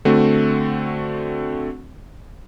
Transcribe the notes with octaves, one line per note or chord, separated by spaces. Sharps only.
D3 A3 C4 F#4